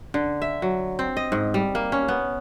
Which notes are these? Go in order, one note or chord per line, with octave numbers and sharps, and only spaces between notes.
D3
E5
F#3
C4
D#5
G#2
G3
A#3
C#4
B3